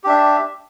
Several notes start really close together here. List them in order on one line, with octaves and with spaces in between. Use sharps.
G4 D4 E5